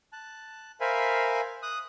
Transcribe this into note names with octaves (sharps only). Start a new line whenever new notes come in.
A5 F#6
A#4 C5 E5 F5 G#5 B5
D#6 F#6